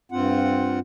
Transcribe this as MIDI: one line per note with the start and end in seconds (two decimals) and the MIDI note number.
0.12 0.79 43
0.12 0.79 60
0.12 0.79 65
0.12 0.79 78